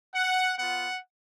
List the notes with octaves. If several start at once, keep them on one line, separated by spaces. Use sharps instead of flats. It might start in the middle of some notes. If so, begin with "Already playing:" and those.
F#5
B3 F4 F#5